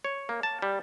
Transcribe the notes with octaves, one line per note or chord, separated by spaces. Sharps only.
C#5
A#3
A5
G3